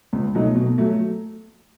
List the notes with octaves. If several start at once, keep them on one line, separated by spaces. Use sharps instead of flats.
C#2
B2 F#3 A3 D#4
B2
F#3 A3